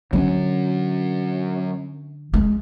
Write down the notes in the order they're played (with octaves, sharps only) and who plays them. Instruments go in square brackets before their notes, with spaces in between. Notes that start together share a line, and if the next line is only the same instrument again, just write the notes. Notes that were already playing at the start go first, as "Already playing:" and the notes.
[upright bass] D3 [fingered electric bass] F#3 C4 C#4
[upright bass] G#3